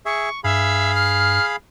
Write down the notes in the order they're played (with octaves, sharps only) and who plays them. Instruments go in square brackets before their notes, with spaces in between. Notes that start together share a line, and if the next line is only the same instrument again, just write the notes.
[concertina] G#4 E5 [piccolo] C#6
[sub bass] G2 [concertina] G#4 F5 B5 [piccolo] E5
[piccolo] F6